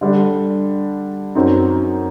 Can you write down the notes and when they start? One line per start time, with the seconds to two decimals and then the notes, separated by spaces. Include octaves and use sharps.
0.01 D3 G3 D4
1.35 F#2 F#3 C4 D#4